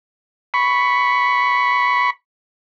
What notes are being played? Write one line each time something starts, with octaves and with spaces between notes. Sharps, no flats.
B5 C#6